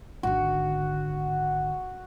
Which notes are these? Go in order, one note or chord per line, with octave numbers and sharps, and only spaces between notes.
G#1 D3 F#4